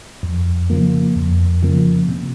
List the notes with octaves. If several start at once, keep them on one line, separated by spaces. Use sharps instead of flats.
F2
C#3 F3 A#3
F2
C#3 F3 A#3
C3